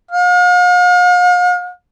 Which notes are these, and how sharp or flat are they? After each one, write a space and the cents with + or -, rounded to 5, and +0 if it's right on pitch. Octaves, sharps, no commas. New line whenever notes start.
F5 +45